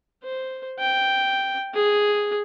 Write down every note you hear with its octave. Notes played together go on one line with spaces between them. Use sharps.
C5
G5
G#4